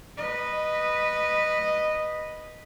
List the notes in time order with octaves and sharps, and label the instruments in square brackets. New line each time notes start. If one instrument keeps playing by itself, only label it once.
[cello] B4 D#5